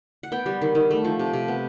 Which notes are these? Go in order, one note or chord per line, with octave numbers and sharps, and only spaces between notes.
F#5
B3 G5
G3
D#3
D#3
A3
F3
C3
C3
B3